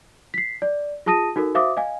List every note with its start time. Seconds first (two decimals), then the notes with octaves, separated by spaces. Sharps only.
0.34 B6 C7
0.62 D5
1.06 F4 G#4 A5 D#6 A#6 D#7
1.36 D#4 F#4 A4 A#4
1.55 F#4 C5 E5 F5 D6 D#6
1.77 D#5 F5 G#5